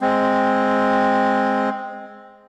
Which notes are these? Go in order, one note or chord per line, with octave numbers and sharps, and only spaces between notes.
G#3 C4